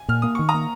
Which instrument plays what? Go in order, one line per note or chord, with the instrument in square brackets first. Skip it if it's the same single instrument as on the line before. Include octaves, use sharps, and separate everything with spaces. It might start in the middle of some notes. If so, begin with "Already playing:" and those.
Already playing: [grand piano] G#5
[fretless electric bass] A#2 [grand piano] F6
[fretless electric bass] A#3 [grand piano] D#6
[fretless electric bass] D#3 [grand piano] C#6
[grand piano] A#5 D#6
[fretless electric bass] A#3